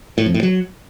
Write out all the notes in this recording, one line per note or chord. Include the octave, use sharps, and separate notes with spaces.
A2
F2
A2
F#3